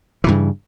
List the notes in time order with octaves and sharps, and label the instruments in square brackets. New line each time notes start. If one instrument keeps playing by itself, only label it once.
[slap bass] E3
A#2
G2
C#3